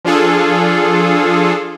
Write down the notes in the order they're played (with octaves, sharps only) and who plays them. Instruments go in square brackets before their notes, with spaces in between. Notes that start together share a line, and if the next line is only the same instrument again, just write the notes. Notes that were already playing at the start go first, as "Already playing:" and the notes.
[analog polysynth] F3 D4 F4 G#4 A4